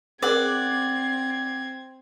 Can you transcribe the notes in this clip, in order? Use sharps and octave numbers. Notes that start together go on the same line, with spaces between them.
C4 G#4 A#4 D5 F#5 G#6